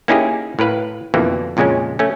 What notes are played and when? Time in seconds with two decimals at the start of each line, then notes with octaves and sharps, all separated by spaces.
0.08 A#3 C#4 D#4 E4 G4 G#4
0.59 A2 A#4 B4 F5
1.14 F2 B2 D3 E3 A#3
1.57 F2 A#2 C#3 G#3 C#4
1.99 A3 C#4